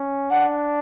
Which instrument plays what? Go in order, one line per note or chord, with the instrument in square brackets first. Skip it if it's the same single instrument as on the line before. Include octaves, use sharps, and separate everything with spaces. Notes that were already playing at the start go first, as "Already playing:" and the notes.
Already playing: [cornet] C#4
[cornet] D4 [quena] F#5